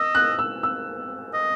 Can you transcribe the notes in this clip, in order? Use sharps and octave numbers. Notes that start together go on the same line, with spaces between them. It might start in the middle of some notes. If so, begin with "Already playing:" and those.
Already playing: D#5 E6
F#6
E6
E6
D#5